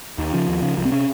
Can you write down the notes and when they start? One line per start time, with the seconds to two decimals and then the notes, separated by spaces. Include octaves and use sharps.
0.18 D#2 D#3
0.33 C#3 F3
0.48 D#2
0.62 C#3
0.77 C2 F3
0.85 C4
0.92 C3 C#4